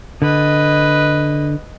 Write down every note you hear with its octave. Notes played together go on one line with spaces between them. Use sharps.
D3 B4 D#5